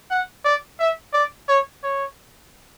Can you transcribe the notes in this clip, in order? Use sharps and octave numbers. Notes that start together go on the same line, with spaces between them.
F#5
D5
E5
D5
C#5
C#5